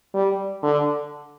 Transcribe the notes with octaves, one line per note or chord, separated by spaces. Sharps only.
G3
D3